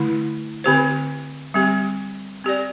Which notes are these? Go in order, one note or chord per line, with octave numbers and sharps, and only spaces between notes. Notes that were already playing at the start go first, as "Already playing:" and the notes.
Already playing: D3 A3 E4
D3 C4 G4 C5
G3 C4 G4
C4 G4 D5